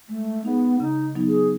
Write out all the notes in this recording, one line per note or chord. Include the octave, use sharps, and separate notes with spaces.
G#3 A3
B3 D#4 G#4
C#3 D#4
F#3 B3 D#4
G#4